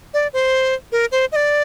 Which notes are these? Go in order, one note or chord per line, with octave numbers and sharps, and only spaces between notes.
D5
C5
A#4
C5
D#5
D5